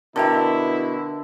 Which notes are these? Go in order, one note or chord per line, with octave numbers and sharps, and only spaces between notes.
B2 D3 E4 A#4 E5 G5 A#5